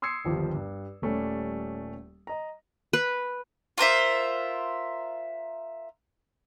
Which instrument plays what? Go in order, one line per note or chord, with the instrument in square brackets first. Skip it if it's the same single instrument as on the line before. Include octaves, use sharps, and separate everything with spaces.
[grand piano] C6 D#6 E6 G#6 C7 C#7
G1 D#2 F3 G4
G2
D#1 G3 A3 C#4 D5
D#5 A#5
[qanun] B4
[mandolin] F4 A#4 C5 E5